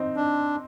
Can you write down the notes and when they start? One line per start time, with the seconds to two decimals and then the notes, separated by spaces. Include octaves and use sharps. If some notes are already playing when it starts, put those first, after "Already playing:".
Already playing: C4 D#4
0.16 D4